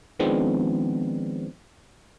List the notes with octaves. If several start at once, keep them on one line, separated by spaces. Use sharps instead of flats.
D#3 F3 G#3 B3 C4 D4